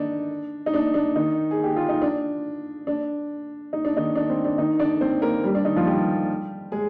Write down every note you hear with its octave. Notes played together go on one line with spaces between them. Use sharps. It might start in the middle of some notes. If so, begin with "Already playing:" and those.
Already playing: D#3 D4 D#4
D#4
D4
D4
D#3 D#4
G#4
G4
F4
D#4
D4
D4
D#4
D4
D#3 D#4
D4
C4
D4
D#3 D#4
D4 D5
C4 C5
A#3 A#4
G3 G4
D4
D#3 D#4
F3 F4
G3 G4
G#3 G#4